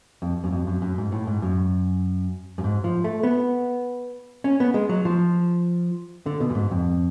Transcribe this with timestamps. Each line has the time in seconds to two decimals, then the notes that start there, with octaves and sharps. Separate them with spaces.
0.22 F2
0.44 F#2
0.52 F2
0.67 F#2
0.82 F#2
0.98 G#2
1.12 A2
1.27 G#2
1.42 F#2
2.58 F#2
2.64 G#2
2.84 F3
3.04 A3
3.23 B3
4.44 C#4
4.60 B3
4.74 G#3
4.89 F#3
5.05 F3
6.26 D3
6.40 B2
6.50 F#2
6.55 G#2
6.71 F2